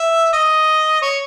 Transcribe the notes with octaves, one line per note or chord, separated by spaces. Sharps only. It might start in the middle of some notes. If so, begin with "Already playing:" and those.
Already playing: E5
D#5
C#5